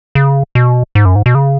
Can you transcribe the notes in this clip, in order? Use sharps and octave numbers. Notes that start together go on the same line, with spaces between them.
C#3
B2
G#2
F#2
G#2
B2
C#3